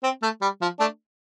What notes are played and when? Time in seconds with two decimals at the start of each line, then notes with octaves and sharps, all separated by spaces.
0.03 C4
0.22 A3
0.41 G3
0.61 F3
0.79 A3 D4